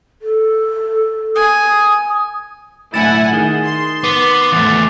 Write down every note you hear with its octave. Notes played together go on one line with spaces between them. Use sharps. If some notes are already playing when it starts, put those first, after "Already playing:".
A4
G#5 D#6
B1 A2 D3 E4 F#5 G#5 A6 E7
D#3 G#4
C6
B3 D6 G7
E2 A3 F#6 A6 F7